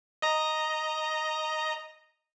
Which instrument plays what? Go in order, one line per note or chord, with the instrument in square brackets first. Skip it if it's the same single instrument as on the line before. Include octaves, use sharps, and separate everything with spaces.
[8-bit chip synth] D#5 A#5